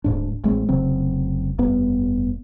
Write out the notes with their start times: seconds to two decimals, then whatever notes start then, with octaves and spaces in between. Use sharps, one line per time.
0.04 D1 G#2 D4
0.44 A1 G#3 C4
0.69 F1 C#3 F#3 C4
1.58 F1 G2 B3